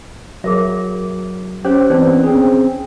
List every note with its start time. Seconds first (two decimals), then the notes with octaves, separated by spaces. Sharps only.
0.44 F#3 G#4 A#4 E5
1.65 C#4 G4 C5 C#5
1.90 E3 B3 C4 D#4 C5 D5
2.24 C4 C#4 G#4